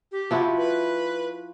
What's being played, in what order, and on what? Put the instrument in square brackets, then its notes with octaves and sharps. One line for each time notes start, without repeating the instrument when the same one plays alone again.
[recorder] G4
[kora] F3 E4 F#4
[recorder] B4